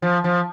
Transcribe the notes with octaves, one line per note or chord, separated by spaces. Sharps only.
F3
F3